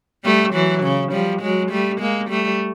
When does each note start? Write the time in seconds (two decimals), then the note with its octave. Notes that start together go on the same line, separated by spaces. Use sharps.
0.24 G3 A3
0.53 E3 F#3
0.83 C#3
1.12 F3 G3
1.42 F#3 G#3
1.71 G3 A3
2.01 G#3 A#3
2.30 G3 A3